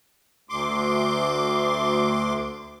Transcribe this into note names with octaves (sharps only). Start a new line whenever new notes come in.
D2 C6 D6